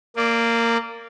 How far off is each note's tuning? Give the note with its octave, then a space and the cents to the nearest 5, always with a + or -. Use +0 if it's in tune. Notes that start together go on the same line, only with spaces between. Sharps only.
A#3 -15 D5 +0